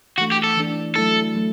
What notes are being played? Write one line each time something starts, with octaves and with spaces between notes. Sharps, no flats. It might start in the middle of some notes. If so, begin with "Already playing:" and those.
E3 A3 D4 F#4
G4
A4
E3 A3 D4
F#3 A3 E4 A4
F#3 A3